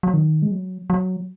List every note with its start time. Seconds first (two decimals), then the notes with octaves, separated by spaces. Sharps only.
0.03 F#3
0.14 D#3
0.42 G#3
0.51 F#3
0.90 F#3